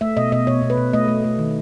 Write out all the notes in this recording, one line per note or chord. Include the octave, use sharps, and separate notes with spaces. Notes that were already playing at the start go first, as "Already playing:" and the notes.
A3 E5
B2 D#5
B2 D#5
B2 C#5
B2
B4
B2
A3 D#5
A3
A3
D#3